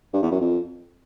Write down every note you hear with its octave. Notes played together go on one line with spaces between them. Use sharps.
G2
E2
F#2
F2